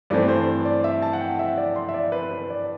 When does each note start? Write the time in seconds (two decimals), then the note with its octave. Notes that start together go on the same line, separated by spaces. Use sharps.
0.10 G2 E3 A3 C4 D5
0.28 C5
0.65 D5
0.84 E5
1.02 A5
1.13 F#5
1.21 G5
1.39 E5
1.57 D5
1.76 C6
1.89 E5
1.94 D5
2.12 B4
2.31 B4
2.50 D5